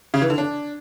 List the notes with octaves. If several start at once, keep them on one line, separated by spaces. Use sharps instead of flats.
C#3
E3
D3
D4